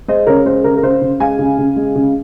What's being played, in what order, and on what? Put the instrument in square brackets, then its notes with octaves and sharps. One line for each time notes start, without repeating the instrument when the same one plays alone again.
[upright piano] G#3 C5 D#5
C#3 A#4 C#5
G#3 C5
C#3 A#4
A#4
C#3 C5
C#3
G#3 F5 G#5
C#3
C#3
G#3
C#3